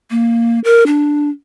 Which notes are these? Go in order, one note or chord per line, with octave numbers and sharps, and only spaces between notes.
A#3
A#4
D4